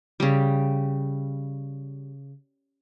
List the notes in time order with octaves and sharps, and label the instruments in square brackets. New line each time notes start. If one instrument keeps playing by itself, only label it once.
[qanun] C#3 G3